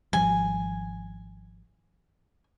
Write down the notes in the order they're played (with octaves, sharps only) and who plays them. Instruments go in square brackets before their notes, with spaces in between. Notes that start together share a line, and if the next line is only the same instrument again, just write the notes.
[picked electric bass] G#1 F3 G3 [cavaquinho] G#5